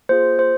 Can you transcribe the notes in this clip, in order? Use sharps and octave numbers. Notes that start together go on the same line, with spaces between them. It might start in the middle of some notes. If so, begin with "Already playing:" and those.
A#3 F4 G#4 C5
C5